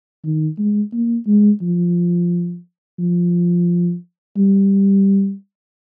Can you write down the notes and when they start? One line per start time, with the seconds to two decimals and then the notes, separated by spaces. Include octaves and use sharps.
0.24 D#3
0.58 G#3
0.93 A#3
1.27 G#3
1.62 F3
2.99 F3
4.37 G3